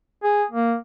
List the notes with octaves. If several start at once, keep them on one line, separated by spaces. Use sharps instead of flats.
G#4
A#3